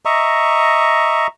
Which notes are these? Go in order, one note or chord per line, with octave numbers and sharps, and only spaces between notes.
D#5 E5 A#5 C#6